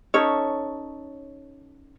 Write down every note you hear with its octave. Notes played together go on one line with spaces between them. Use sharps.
C#4 D#4 A4 C#5